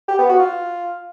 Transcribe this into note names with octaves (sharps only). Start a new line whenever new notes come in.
G4
B3
F#4
F4